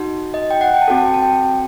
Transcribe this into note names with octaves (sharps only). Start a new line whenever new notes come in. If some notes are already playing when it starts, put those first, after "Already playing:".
Already playing: D#4 F#4
D#5
G5
F#5
G5
A5
C4 F#4 A4 G5
A5
G5
A5
G5